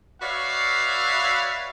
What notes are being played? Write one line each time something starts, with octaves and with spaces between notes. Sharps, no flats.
F#4 B4 C#5 D5 E5 F5